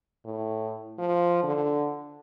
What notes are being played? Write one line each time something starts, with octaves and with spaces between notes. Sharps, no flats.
A2
F3
D3